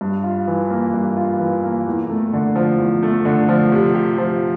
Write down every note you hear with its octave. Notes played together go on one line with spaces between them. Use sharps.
G2
F4
E3
A#3
G2
F4
E3
A#3
E2
A3
D3
F3
E2
A3
D3
F3
C3
G4
F3